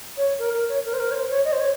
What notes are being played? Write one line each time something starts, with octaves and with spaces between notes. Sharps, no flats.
C#5
A#4
A#4
C#5
A#4
C5
A#4
C#5
C5
C#5
D#5
C5
C#5